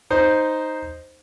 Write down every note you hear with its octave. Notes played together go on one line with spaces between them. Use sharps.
D#4 C5